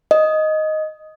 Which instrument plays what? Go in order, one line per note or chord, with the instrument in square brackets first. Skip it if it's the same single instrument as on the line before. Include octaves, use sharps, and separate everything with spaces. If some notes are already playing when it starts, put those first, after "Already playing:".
[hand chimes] D#5